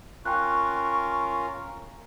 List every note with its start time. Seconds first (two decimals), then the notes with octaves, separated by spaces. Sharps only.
0.25 C#4 F4 A#4 G5 C#6 F#6